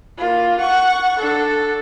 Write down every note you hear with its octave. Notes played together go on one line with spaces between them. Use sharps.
A#3 F4
F#5 C#6
D4 A4